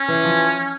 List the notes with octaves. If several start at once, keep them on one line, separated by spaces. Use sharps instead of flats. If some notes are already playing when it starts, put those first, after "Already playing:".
Already playing: C#4
E3
F3